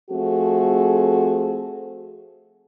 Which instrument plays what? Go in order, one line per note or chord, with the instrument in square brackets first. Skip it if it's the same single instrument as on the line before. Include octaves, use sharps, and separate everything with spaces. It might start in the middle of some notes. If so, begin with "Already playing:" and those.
[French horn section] F3 A3 C4 F#4 G#4 A4